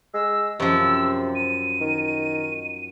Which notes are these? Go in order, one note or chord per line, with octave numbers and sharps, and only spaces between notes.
G#3 E6
F#2 C3 F3 E6
D#7
D#3